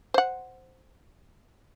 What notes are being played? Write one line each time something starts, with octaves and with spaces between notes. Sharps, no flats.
C5 F#5